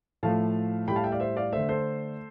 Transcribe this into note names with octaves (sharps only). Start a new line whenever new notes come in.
A2 F3 A3 F5 A5
A2 G3 G5 B5
F5 A5
E5 G5
D5 F5
C5 E5
D5 F5
D3 A3 C5 E5
A4 C5